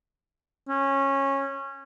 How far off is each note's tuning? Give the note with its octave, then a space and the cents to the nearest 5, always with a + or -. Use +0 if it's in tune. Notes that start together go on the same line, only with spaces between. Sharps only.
C#4 -15